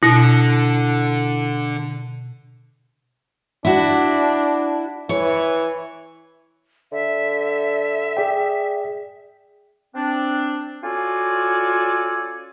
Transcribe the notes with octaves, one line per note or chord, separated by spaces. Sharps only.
B2 D3 E4
D4 E4 F#4
E3 C#5
D3 E5
G#4 D5 G5
C4 D4
C#4 F4 F#4 A4 D5 G#5